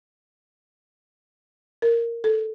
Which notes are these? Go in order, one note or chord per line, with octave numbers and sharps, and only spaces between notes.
A#4
A4